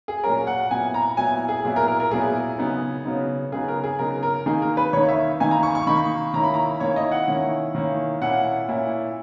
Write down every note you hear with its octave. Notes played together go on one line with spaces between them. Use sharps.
G#4
A#2 F#3 C#4 A#4
F#5
A#2 F#3 B3 E4 G#5
A#5
A#2 F#3 B3 E4 G#5
G#4
A#2 F#3 B3 E4 G#4
A#4
A#4
A#4
A#2 F#3 B3 E4 G#4
C#3 F#3 B3 D#4
C#3 F#3 B3 D#4
C#3 F#3 B3 D#4 G#4
A#4
G#4
C#3 F#3 B3 D#4 A#4
A#4
D#3 A#3 D#4 G#4
A#4
B4
D#3 A#3 D#4 C#5
E5
D#3 A#3 D#4 G#5
A#5
C#6
C#6
D#3 A#3 D#4 B5
D#3 A#3 C#4 E4 A#5
B5
A#5
D#3 A#3 C#4 E4 C#5
D#5
F#5
D#3 A#3 C#4 E4
D#3 A#3 C#4 E4
A#2 A#3 C#4 E4 F#5
A#2 A#3 C#4 E4